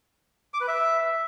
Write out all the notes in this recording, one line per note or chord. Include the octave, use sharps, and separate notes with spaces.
D6
B4
E5